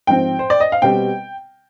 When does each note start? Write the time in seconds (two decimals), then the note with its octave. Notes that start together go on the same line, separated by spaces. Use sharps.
0.07 G#2 F3 C4 G5
0.39 C5
0.50 D5
0.60 D#5
0.72 F5
0.82 B2 G3 C4 G5